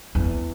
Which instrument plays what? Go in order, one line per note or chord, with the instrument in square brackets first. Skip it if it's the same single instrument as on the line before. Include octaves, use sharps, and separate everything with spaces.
[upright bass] E2